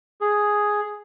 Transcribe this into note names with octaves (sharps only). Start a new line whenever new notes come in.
G#4